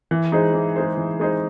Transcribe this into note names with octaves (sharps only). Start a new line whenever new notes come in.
E3
G#3 D#4 G#4 C5
E3
G#3 D#4 G#4 C5
E3
G#3 D#4 G#4 C5